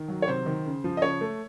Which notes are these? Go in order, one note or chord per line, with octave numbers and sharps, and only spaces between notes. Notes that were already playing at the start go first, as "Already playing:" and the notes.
Already playing: D#3
F#3
C#5
C3 C5
D#3
C#3
F3
D#5
C#3 C#5
A3